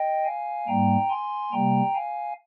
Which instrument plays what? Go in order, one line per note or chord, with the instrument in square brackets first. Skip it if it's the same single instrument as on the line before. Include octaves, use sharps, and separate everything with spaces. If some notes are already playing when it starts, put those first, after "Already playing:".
Already playing: [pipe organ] D#5 G5
F5 G#5
G#2 G3 A#3 G5 A#5
G#5 C6
C3 G3 A#3 G5 A#5
F5 G#5